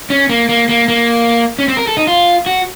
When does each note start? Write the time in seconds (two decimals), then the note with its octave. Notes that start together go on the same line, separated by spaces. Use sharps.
0.10 C#4
0.29 A#3
0.49 A#3
0.69 A#3
0.88 A#3
1.59 C#4
1.68 C4
1.77 A#4
1.87 A4
1.97 D#4
2.07 F4
2.46 F#4